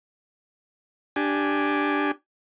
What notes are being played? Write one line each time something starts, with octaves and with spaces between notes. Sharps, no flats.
D4 G4 G#5